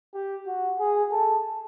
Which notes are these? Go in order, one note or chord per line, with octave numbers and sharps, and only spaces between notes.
G4
F#4
G#4
A4